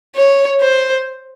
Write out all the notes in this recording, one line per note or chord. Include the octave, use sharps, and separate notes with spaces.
C#5
C5